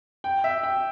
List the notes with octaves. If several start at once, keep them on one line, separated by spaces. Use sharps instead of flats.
G5
E5
G5